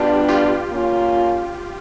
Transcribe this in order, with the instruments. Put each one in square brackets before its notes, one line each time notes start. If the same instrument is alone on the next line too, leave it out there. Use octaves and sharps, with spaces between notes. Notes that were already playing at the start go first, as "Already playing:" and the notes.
Already playing: [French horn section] B2 G3 B3 D4 [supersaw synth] F4 G4
[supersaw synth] F4 G4
[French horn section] A#3 C#4 F4